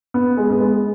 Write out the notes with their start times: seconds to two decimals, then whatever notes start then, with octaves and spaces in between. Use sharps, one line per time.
0.14 B3
0.37 G#3
0.50 B3
0.60 G#3